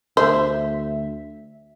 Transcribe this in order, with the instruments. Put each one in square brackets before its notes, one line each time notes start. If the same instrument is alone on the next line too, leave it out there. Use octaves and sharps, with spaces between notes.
[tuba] D2 [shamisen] C5 [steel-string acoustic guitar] E5